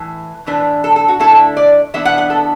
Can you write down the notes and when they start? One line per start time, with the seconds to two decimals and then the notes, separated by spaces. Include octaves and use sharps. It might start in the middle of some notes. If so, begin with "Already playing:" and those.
Already playing: A2 E3
0.47 A2 E3 D4 B4
0.84 A4
0.96 A4
1.08 F#4
1.19 D3 A3 E4 A4
1.57 D5
1.94 E3 B3 D4 E5
2.05 F#5
2.18 F#5
2.30 A4